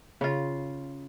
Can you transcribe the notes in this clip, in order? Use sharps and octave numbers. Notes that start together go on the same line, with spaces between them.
C#3 F4